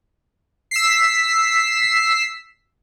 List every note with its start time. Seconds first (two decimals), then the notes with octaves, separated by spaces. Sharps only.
0.71 E6 B6 C7